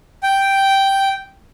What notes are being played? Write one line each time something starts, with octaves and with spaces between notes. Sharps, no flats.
G5